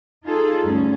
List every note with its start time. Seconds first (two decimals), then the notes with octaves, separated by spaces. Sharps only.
0.23 D#4 F4 G#4 A4
0.62 D2 G2 C#4